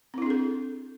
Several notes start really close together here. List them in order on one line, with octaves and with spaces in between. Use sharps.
C4 E4 D4 G#4 A4